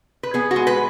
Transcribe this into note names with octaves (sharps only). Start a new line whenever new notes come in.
B4
B3 G#4
F#4
G#3
B4